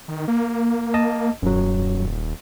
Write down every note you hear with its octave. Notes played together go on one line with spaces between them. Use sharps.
D#3
A#3
D#5 A5
D#1 F#2 F#3